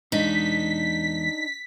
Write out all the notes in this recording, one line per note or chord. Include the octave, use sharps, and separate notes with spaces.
E2 G#3 D4 D#4 F5 B6